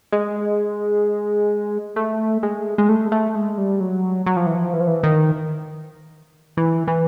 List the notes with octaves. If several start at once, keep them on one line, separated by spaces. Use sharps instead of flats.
G#3
A3
G#3
G#3
A3
A3
G#3
G3
F#3
F#3
F3
E3
F3
E3
F3
E3
D#3
E3
E3